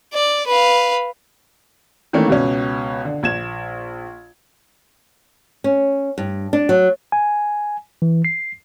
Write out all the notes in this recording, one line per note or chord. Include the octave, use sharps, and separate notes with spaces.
D5
B4 F5
D#3 E3 A3 A#3 C#4 D#4
C#2 B2 C#4
D3
A#1 G#6 E7
C#4
G2
D4
F#3
G#5
E3
C7